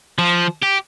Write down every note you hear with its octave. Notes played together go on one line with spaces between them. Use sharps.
F3
G4